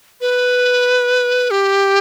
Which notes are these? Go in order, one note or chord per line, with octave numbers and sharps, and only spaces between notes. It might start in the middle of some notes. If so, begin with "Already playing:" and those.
B4
G4